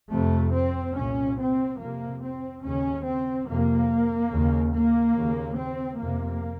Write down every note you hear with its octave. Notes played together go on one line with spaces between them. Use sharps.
F2 C3 A3
C4
C2 A#2 C#4
C4
F2 C3 A#3
C4
D#2 C#3 C#4
C4
F2 C3 A#3
D#2 C#3
A#3
D#2 C#3
C4
F2 C3 A#3